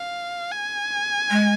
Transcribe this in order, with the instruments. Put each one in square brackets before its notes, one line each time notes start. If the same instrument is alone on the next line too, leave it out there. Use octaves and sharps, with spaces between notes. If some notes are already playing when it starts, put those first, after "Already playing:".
Already playing: [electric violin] F5
G#5
[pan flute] G#3